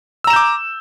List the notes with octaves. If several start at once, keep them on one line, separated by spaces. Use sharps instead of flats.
A#5 D6 E6 G6 E7